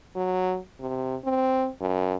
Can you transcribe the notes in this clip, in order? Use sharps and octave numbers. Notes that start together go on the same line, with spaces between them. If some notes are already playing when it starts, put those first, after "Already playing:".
F#3
C3
C4
F#2